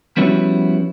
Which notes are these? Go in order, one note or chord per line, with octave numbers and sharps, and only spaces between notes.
F3 G3 B3 C#4 E4 F#4